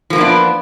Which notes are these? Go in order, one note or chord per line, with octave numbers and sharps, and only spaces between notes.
F3 A#3 B3 D4 F4